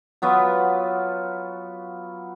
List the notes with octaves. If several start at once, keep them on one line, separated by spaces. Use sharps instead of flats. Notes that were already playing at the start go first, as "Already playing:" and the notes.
F#3 B3 F4 F#4